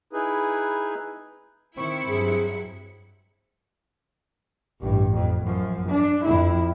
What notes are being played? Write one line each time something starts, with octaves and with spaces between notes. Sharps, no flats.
D#4 E4 G#4 B4
D#3 C4 E4 C#6 C#7
G2 F#3 G#4
A1 G2
F2
F#2 F3
D4
F2 E4